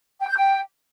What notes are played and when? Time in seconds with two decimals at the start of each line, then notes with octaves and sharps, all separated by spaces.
0.21 G5
0.29 G6
0.36 G5